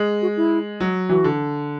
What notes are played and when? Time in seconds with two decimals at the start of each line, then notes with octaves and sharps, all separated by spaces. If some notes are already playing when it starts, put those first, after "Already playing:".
Already playing: G#3
0.22 F#4
0.37 E4
0.80 F#3
1.09 E3 F#4
1.24 D3